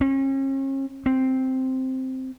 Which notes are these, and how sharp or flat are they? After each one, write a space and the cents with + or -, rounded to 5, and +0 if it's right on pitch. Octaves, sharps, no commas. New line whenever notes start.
C#4 -40
C4 +0